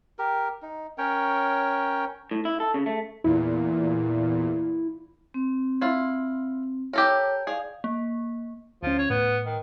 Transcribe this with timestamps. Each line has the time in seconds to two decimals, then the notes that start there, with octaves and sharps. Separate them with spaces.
0.19 G4 A#4
0.62 D#4
0.98 C#4 A#4 C#5 G5
2.31 A2
2.45 E4
2.60 A4
2.74 C#3
2.86 A3
3.24 E2 A#2 E4
5.34 C4
5.81 E4 F4
6.93 G4 A4 A#4 C#5
7.47 G#4 D5 F5
7.84 A#3
8.83 D2 F3 C#4
8.98 C#5
9.10 A2 B3
9.46 D#3